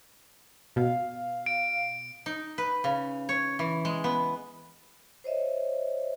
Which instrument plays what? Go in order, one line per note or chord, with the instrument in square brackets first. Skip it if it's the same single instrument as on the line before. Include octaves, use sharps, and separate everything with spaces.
[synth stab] B2 [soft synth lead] F5
[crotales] D7
[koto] D#4
B4
C#3
C#5
E3
G#3
B3
[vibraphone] C5 C#5 D#5 E5